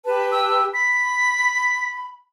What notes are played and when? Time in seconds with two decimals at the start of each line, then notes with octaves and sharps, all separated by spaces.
0.06 G4 B4 A5
0.32 E6
0.74 B5 B6